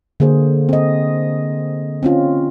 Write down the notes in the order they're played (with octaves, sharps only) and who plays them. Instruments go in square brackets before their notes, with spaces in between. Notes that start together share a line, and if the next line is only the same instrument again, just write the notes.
[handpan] D3 A#3 G#4 C5
C4 D#5
C4 C#4 F4